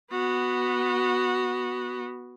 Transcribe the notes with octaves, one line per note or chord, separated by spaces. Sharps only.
B3 F#4